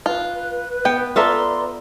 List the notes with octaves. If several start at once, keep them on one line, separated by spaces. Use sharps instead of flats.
F4 B4
B3 G5
F4 A4 B4 D5 E5 A#5 C6